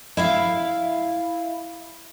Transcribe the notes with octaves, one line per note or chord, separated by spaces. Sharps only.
E4 E5 F5